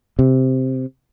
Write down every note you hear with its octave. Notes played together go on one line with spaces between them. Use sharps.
C3